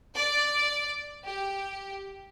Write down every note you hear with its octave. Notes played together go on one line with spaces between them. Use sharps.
D5
G4